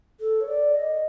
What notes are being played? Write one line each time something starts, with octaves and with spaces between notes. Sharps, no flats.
A4
C#5
D5
D#5